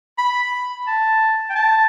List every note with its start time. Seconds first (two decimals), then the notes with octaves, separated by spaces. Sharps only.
0.19 B5
0.87 A5
1.50 G5
1.56 A5